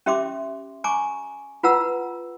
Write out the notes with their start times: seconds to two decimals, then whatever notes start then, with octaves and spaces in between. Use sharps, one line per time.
0.06 C#4 G4 E5 C6 D6
0.84 G#5 A#5 C#6 D6
1.63 F4 B4 F#5 A#5 E6